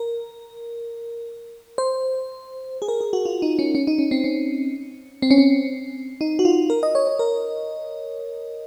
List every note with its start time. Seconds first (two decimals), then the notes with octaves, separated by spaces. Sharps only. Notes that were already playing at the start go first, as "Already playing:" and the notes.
Already playing: A#4
1.78 C5
2.82 G#4
2.88 A#4
3.01 G#4
3.13 F#4
3.25 F4
3.42 D#4
3.59 C#4
3.75 C#4
3.87 D#4
3.99 C#4
4.11 C4
4.24 C#4
5.22 C4
5.31 C#4
5.38 C4
6.21 D#4
6.39 F#4
6.45 F4
6.70 A#4
6.83 D#5
6.95 C#5
7.07 C#5
7.19 A#4